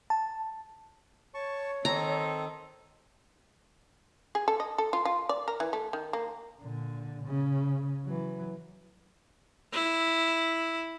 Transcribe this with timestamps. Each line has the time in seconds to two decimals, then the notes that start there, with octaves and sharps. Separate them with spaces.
0.10 A5
1.34 C#5 A5 C#6
1.85 D#3 C4 A4 A#5
4.35 G#4
4.48 A4
4.60 D#5
4.78 A4
4.93 F4
5.05 F4
5.29 D5
5.48 A#4
5.60 E3
5.73 A3
5.93 D#3
6.13 A#3
6.62 A#2 D3
7.25 C#3
8.05 E3 F#3
9.72 E4